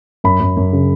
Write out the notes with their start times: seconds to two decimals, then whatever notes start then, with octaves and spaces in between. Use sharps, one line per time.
0.24 F#2 B5
0.40 F#2
0.57 F#2
0.73 C#3